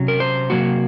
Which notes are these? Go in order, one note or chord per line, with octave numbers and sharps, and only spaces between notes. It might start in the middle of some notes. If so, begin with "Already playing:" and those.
Already playing: C3 F#3 C#4
A#4
C5
C3 F#3 A#3 F#4